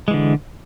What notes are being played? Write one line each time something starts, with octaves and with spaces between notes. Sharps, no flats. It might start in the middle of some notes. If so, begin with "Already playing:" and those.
D3 E3 G#3